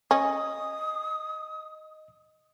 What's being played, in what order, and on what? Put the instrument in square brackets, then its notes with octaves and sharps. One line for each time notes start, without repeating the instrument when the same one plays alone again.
[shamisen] C#4 [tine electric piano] D#5 [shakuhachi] D#6